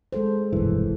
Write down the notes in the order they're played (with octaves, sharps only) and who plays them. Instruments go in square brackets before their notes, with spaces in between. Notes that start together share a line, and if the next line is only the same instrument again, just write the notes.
[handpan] G#3 A4 C5
[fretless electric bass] F1 E3 [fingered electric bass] B1 G2